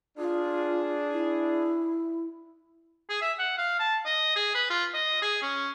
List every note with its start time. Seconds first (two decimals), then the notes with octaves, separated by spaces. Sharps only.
0.18 D4 F4 G#4
1.12 E4
3.09 G#4
3.22 E5
3.39 F#5
3.58 F5
3.79 A5
4.06 D#5
4.36 G#4
4.55 B4
4.70 F4
4.94 D#5
5.22 G#4
5.42 C#4